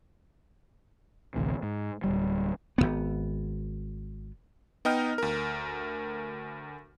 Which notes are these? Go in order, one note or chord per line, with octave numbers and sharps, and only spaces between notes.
A1 D2 C3
G#2
D1 G#1 G3
G#1 F2 B3
B3 D#4 D#5 G5 F6
D2 A#4